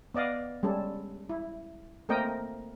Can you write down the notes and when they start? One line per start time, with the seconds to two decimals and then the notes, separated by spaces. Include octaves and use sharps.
0.14 B3 D5 D#5 F5
0.63 G3 G#3 C#4 A4
1.29 E4
2.09 A3 A#3 C4 A#4 D#5 G5